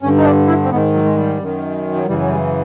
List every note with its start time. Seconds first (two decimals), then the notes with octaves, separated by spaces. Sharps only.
0.02 G2 D3 C#4
0.18 D#4
0.25 D4
0.47 E4
0.64 C4
0.70 G#2 B3
0.74 D#3
0.93 F#3
1.04 G#3
1.16 G3
1.38 F#2 D#3
1.95 F#3
2.07 F#2 C#3 E3 G3
2.20 F#3
2.30 G3